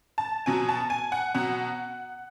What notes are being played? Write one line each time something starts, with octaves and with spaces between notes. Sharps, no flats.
A5
B2 F#3 G#5
A5
G#5
F#5
B2 F#3 F#5